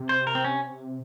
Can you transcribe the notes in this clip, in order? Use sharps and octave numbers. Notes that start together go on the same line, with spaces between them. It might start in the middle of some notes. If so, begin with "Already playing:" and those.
Already playing: C3
C5
A#4
C4
C#4